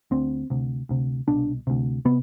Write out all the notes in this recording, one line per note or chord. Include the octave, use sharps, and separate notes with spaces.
D2 D3 C4
D2 C3
D2 C3
C2 B2 D4
D2 C3
C3 B3